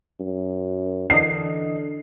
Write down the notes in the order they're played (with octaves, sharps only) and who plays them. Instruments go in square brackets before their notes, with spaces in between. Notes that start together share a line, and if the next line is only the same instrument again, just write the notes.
[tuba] F#2
[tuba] D3 [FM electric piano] E3 D4 D#5 [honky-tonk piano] C7